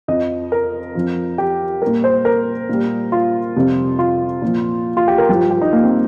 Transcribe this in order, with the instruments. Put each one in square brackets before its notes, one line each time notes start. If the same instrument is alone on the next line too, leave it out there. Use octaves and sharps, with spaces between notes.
[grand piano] F2 F3 D#5
A#4
F2 F3
G4
A#2 G3 A#4
C5
A#4
A#2 G3
F4
F2 C3 G3
F4
A#2 F3
F4
G4
A#4
G2 F3 G4
F4
G4
D#4
A#3
C4